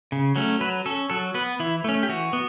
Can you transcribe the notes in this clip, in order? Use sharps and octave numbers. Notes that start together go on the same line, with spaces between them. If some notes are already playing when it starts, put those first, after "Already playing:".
C#3
F#3 A3 C#4
F#3 B4
C#4 A4
F#3 A4
B3 B4
E3 E4
A3 C#4
G4
E3 F#4
B3